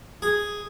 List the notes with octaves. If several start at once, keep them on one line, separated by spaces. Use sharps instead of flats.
G#4